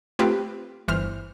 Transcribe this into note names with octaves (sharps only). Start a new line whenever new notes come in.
A3 C4 F4 G4 B4
G1 E3 C5 F6